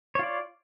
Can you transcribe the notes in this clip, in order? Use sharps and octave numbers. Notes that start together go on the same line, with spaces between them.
F4 C#5 D5